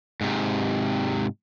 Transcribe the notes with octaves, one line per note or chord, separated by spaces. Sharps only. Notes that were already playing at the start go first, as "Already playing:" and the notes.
G#2 C3